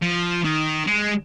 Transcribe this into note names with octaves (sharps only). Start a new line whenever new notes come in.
F3
D#3
G#3